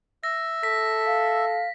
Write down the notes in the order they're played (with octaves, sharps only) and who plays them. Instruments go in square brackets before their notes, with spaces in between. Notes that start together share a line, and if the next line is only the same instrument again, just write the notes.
[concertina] E5 [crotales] A#6
[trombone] A4 [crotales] B6
[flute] F5